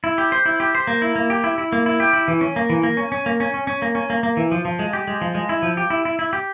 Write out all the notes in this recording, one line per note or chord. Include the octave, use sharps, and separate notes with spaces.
E4
G4
C5
E4
G4
C5
A#3
E4
A#3
G4
E4
E4
A#3
E4
G4
E4
E3
C#4
A#3
E3
A#3
C#4
C#4
A#3
C#4
C#4
C#4
A#3
C#4
A#3
A#3
E3
F3
F3
G#3
G4
G#3
F3
G#3
E4
F3
G4
E4
E4
E4
G4